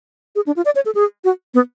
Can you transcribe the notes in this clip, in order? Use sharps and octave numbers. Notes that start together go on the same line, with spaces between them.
G#4
D4
F4
D5
C#5
A4
G#4
F#4
B3